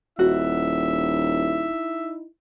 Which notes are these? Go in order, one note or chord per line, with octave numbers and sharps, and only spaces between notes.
D#1 D#4 E4 F#4 E5